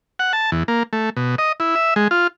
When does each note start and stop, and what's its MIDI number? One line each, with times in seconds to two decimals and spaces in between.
0.19 0.33 78
0.33 0.51 81
0.52 0.63 40
0.68 0.83 58
0.93 1.10 57
1.17 1.35 47
1.38 1.52 75
1.60 1.75 64
1.76 1.94 76
1.96 2.08 56
2.11 2.27 65